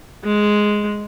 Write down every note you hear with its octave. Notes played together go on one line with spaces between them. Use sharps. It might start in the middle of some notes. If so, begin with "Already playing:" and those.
G#3